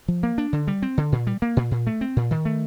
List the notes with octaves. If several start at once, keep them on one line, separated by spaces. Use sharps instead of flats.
F3
A#3
D4
D3
G3
C4
D3
A#2
G3
A#3
A#2
A#2
A3
C4
A#2
D#3
A3